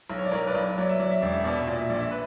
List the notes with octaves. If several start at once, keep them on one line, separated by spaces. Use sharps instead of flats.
B1
C#5
D5
B1 A#4 C#5
B4 D5
B1
F#3 D5
E5
F#3 D5
E5
E1 D5
E5
B2 D5
E5
A#2 D5
E5
A#1 D5
E5
B4